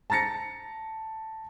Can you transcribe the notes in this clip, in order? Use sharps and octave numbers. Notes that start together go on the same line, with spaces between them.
A5 A#5 A6 A#6 C#7